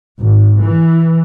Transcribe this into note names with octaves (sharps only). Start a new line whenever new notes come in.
G#1
E3